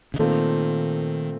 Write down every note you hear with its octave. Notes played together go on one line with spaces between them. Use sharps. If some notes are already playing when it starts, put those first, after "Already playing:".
C#3
A#2 D#3 A3 C4 F4